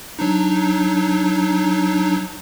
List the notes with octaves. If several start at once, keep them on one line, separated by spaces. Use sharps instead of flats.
F#3 D4 D#4